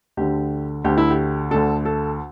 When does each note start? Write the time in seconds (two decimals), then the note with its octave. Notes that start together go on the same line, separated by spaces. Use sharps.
0.17 D2 D3 G4
0.84 D2 D3 G4
0.98 E4
1.11 G4
1.51 D2 D3 A4
1.85 A4